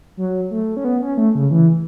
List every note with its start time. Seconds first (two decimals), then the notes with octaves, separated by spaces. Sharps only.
0.17 F#3
0.51 A3
0.77 C#4
0.84 B3
1.02 C#4
1.17 A3
1.35 C#3
1.51 E3